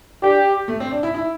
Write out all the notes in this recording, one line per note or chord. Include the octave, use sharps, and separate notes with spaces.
D4 G4
A3
C4
D4
E4
E4